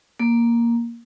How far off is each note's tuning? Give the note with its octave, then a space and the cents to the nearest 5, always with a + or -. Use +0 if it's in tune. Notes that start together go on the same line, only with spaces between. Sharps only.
A#3 +5